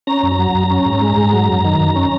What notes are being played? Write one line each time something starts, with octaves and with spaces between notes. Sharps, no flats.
C#4 A#5
F#2
F#3
F#2
C#4
G#2
G#3
G#2
F#3
F#2
D#3
F#2
C#4